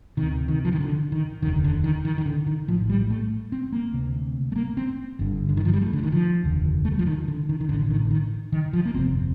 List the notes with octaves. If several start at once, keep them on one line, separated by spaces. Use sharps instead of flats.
D2 C3 D#3
D#3
F3
D#3
D3
D#3
F1 D#2 D3 D#3
D3
D#3
D#3
D#3
D3
D#3
A#1 A2 F3
G3
A3
C4
A#3
D2 C3
A3
A#3
C4
G1 G2 D3
D3
D#3
F3
G3
A3
D3
D#3
F3
F1 D#2 D3
A3
G3
F3
D#3
D3
D#3
D#3
A1 A2 D3
D3
D#3
D3
D#3
D#3
F3
A#3
G1 F2 C3 C4